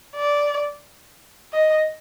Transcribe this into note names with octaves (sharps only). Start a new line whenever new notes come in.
D5
D#5